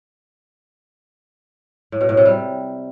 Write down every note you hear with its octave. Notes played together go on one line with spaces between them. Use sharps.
A2
B2
A2
C3
G3